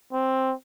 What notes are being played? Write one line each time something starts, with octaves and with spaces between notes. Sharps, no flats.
C4